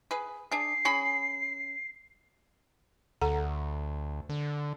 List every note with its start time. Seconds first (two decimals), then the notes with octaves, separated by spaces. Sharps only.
0.11 G#4 B4
0.52 D4 G#4 C7
0.85 C#4 G#4 B5
3.22 D2 A4 F#5 A#5
4.29 D3